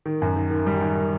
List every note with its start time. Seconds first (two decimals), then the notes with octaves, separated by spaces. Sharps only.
0.06 D#3
0.22 F#2
0.36 D#3
0.50 D#3
0.66 G3
0.81 D#3